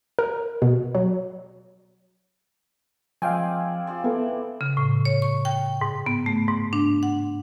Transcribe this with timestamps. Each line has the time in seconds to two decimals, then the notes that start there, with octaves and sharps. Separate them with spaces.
0.19 A#4
0.62 B2
0.95 F#3
3.22 F3 G#3 C4 D5 F5 G5 G#5
3.87 F4 C5 D5
4.04 E3 B3 A4 B4
4.61 C#3
4.77 A2
5.05 C#5
5.22 C#6
5.45 G5
5.81 G#2
6.06 B3
6.26 A3
6.48 G#2
6.73 D4
7.03 F#5